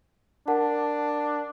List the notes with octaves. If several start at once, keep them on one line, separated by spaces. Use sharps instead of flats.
D4 A#4 F#5 A5